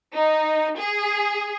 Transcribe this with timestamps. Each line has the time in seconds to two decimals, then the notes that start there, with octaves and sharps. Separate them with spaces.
0.14 D#4
0.77 G#4